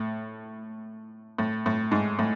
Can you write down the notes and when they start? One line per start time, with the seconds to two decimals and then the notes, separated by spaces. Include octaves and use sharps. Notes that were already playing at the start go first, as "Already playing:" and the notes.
Already playing: A2
1.38 A2
1.66 A2
1.91 G#2
2.19 A2